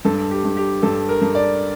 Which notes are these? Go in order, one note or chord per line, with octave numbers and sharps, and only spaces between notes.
G2 A4
G4
G2
G4
G2 A4
A#4
G2
D5